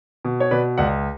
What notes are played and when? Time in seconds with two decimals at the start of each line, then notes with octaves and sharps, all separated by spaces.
0.25 B2
0.40 C#5
0.51 B2 B4 D5
0.78 C#2 D5 F#5